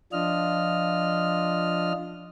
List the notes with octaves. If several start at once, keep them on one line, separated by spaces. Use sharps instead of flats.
F3 D4 F4 D#5 F6